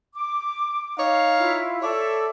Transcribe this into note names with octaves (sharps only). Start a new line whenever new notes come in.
D6
D#4 C#5 F5
E4 F4
A4 C#5 D5 E5